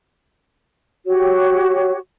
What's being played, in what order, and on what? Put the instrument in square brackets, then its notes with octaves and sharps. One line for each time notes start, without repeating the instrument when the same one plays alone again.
[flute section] F#4 G4 C#5